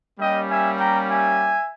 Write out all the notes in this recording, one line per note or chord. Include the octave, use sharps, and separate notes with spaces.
G3 A#3 C#4 G4 D#5 G5
E5 G#5
G5 A#5
E5 G#5